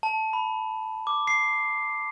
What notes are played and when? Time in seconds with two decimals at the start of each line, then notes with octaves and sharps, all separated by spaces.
0.03 A5
0.33 B5
1.07 D6
1.27 C7